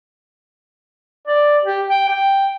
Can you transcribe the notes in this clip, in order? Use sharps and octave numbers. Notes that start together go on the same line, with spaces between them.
D5
G4
G5
G5